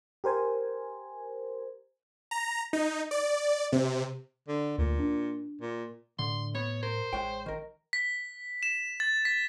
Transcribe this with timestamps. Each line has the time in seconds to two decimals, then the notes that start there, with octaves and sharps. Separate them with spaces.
0.24 G4 A#4 C5 G#5
2.31 A#5
2.73 D#4
3.11 D5
3.72 C3
4.48 D3
4.78 D2 A#2
4.99 D4
5.61 A#2
6.19 A2 D3 C6
6.55 B3 C#5
6.83 A#4 C5
7.13 A1 G#3 C#5 G5
7.46 D#3 A#4
7.93 B6
8.63 E7
9.00 A6
9.25 B6